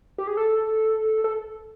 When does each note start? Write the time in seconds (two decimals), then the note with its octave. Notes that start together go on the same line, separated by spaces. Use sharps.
0.18 G4
0.27 G#4
0.37 A4
1.24 A4